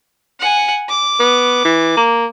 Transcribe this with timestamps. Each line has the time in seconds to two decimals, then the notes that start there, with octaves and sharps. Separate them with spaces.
0.40 F#5 G#5
0.89 D6
1.19 B3
1.65 E3
1.97 A#3